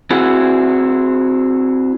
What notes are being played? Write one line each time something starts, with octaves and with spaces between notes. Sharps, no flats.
C4 E4 F#4 G#4